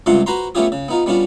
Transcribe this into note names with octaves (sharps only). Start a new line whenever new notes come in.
C#2 G2 C3 F4 F#5 C6
F#4 B4 C5 A#5 C6
A3 B3 C#4 F4 G4 G#4
C#3
B3 D#4 F4
G3 B3 C#4 D4 F4